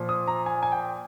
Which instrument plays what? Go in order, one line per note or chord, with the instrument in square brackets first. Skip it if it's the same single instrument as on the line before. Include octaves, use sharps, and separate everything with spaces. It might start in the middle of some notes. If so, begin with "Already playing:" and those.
Already playing: [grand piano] A#2 F3
D#6
A#5
G#5
G#5
G5